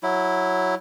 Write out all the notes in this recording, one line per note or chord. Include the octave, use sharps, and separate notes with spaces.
F#3 E4